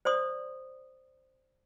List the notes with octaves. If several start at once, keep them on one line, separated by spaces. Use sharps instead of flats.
C5 D5 C6 D#6